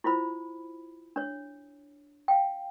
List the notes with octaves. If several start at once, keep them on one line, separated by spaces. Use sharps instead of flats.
E4 F4 C5 B5
D4 C#5
F5 G5